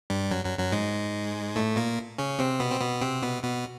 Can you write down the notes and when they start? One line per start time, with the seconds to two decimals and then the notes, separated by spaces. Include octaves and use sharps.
0.10 G2 G3
0.31 F#2 F#3
0.45 F#2 F#3
0.59 F#2 F#3
0.72 G#2 G#3
1.56 A2 A3
1.76 A#2 A#3
2.18 C#3 C#4
2.39 C3 C4
2.60 B2 B3
2.71 C4
2.80 B2 B3
3.01 C3 C4
3.22 B2 B3
3.43 B2 B3